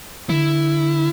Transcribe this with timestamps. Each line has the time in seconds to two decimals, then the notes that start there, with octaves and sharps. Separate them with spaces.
0.29 D3 E4